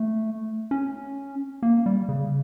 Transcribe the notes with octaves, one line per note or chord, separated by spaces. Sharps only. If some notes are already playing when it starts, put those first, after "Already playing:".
Already playing: A3
C#4
A#3
G3
C#3